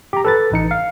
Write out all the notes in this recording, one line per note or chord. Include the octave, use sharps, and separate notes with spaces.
G4 A#5
A4 B4 A6
A1 D#4 C#7
F5